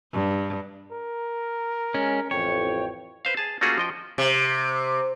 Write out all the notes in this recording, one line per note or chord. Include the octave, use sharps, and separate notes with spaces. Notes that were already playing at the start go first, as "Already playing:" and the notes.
G2
A#4
G#3 C#4
A1 F2 C#5 G5
B4 C5 F5
G#4 A5
A3 A#3 C#4 F4 F#4 G#4
F3 D#5 G5
C3